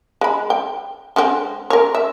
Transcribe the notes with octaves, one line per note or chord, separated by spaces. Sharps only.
G#3 B5
G5
D3 G#3 C4
A#4 C#5
E5